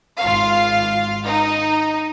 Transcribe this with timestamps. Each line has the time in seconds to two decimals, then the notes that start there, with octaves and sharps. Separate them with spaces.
0.21 G#1 F4 F5
1.24 D#4